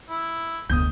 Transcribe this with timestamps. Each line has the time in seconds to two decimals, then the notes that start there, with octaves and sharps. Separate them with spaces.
0.09 E4
0.70 F1 D2 B3 D#6 G6